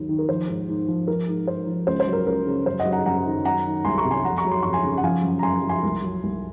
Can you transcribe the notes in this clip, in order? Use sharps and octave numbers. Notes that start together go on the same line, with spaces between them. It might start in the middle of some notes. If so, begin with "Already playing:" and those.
Already playing: D#2 F#3
D#3
A#4
F3 C5
G#2
G#2
F3
F3 A#4
G#2
G#2 C5
F3
C#2 C5
C5
F#3
A#4
C#2 A#4
C#3
F#2 C5
D#5 F#5
F#3
F#5 A#5
F#2 F#5 A#5
D#3
F#3 F#5 A#5
D#3
C2 G#5 C6
A#5 C#6
C3
G#5 C6
F2 F#5 A#5
A#5 C#6
F#3
C6
F2 C#6
G#5 C6
C#3
F#5
F3 F5 G#5
F#2
A#5
F#2 G#5 C6
F3
G#5 C6
C2
F#3
C2